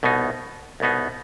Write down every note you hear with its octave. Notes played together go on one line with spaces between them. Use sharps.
C2 B2 B3 D#4
C2 B2 B3 D#4